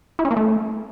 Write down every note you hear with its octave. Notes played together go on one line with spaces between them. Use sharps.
E4
C#4
A#3
A3